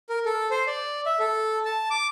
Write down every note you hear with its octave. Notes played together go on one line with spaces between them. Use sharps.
A#4
A4
C5
D5
E5
A4
A5
D6